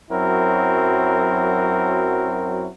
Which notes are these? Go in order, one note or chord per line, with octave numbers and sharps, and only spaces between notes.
F#2 F#3 C4 E4 F#4 A#4